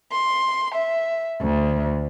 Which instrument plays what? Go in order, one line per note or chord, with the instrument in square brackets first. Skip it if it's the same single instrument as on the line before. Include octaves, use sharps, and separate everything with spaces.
[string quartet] C6
E5
D2